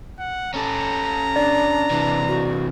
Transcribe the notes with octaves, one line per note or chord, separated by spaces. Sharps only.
F#5
C#4 A4 A#5
D4 D5
C3 E3 D4
F#4